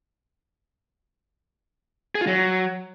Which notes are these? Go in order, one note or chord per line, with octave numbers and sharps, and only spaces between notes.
G#4
F4
F#3